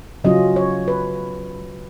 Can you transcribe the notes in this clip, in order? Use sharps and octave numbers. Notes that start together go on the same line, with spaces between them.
C#3 F#3 C#4 F4 D#5
C#5
B4